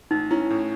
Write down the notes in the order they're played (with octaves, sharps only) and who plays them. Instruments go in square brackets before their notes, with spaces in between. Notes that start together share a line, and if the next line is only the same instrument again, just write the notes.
[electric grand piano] A1 [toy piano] D#4
[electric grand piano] C#4 [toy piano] E4
[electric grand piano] A2